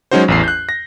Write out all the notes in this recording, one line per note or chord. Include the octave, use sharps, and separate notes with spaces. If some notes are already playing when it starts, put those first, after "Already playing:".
F#3 G#3 C#4 D#4 F#4 C5
A1 E2 C7
F#6 G6
A#6